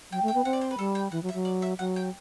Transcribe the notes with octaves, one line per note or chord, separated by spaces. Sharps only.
F#3 G5
A3
G5
B3
C4 F#5
D5
C5
B4
G3 A4
G5
E3 F#5
F#3
E5
F#3
D5
E5
F#3 F#5
G5